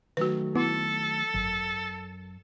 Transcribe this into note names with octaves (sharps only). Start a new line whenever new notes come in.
D#3 F#3 A3 F#4 B4
B3 E4 A4 C6
G#1 F#2 B6